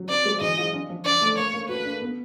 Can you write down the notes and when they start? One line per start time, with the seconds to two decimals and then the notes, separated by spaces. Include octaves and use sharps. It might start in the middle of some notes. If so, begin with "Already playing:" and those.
Already playing: F#3
0.09 C4 D5
0.25 G#3
0.41 E3 D#5
0.58 F4
0.74 D4
0.90 F3
1.05 D4 D5
1.21 A3
1.37 A#3 C#5
1.54 A#3
1.69 F#4 B4
1.85 D4
2.02 B3